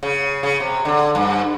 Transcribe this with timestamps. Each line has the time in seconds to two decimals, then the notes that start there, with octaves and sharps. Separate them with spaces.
0.03 C#3
0.43 C#3
0.60 C3
0.85 D3
1.15 G2